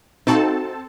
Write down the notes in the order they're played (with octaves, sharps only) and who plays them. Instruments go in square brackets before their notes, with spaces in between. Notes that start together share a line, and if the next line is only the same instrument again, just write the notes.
[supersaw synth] C4 A4 A5 [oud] D#4 F#4